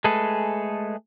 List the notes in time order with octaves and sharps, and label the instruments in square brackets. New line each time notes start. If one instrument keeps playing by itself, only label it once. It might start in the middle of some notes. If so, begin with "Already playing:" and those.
[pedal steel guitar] G#3 A3 G#4 A4 B4